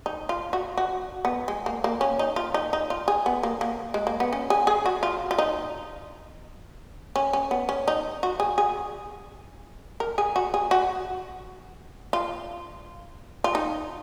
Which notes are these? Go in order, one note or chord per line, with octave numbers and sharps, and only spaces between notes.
D#4
F4
F#4
F#4
B3
G#3
A#3
A#3
C#4
D#4
F4
D#4
D#4
F4
G#4
B3
A#3
A#3
G#3
A#3
B3
C#4
G#4
G#4
F#4
F4
F4
D#4
C#4
C#4
B3
C#4
D#4
F#4
G#4
G#4
A#4
G#4
F#4
G#4
F#4
F4
F4
D#4